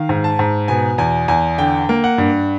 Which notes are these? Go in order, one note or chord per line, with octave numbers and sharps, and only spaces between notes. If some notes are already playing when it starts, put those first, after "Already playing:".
Already playing: D#3 F5
G#2
A5
G#2
B2 G#5
E2 G#5
E2 G#5
D3 G5
A#3
F#5
G2